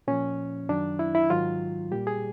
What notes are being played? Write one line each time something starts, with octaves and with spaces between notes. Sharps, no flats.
A#2 F3 C#4
F#2 D#3 F#3 D4
E4
E4
G#2 D#3 F#3 F4
A#2 G3 G4
G#4